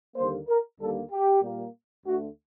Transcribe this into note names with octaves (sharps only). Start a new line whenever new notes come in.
D#2 D3 G3 A#3 C5
A#4
D#2 D3 G3 A#3 A4
G4
A#2 G3 A#3
D2 D3 A3 F#4